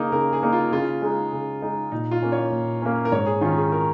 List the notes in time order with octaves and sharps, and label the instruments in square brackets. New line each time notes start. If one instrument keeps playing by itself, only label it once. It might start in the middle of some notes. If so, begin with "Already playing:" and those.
Already playing: [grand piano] C#3 A#3 D#4
[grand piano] C#3 [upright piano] A#4
[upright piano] G#4
[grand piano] A#3 D#4
[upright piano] F4
[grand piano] C#3 [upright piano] F4
[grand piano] G#3 D#4
C#3
G#3 D#4
[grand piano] A#2 [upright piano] D#4
[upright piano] F4
[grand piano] A#3 C#4
[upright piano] C#5
[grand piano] A#2
A#3 C#4
[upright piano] A#4
[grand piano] G#2 [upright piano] C#5
[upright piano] G#4
[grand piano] D#3 C#4 [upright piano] F4
[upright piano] G#4
A#4